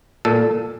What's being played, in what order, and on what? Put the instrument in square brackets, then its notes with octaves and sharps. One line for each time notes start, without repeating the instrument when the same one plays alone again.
[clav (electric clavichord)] A#2 A4